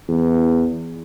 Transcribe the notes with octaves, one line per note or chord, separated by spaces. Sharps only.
E2